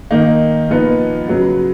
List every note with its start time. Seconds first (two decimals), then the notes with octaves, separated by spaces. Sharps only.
0.11 D#3 A#3 D#4
0.69 A#2 F3 B3 D#4
1.28 C#3 F#3 B3